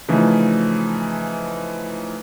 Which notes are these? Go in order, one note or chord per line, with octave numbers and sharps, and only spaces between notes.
C#3 E3 F3 A3 D#4